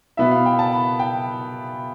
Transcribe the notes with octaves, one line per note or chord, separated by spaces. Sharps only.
B2 B3 E4 E5
F5
G5
A5
B5
G5